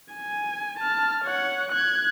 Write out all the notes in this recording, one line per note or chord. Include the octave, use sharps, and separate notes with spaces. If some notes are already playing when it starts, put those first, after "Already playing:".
G#5
A5 F6
C#5 F#5
F#6 G#6